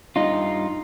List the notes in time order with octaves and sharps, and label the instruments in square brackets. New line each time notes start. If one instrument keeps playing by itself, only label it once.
[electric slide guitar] G2 D#4 F4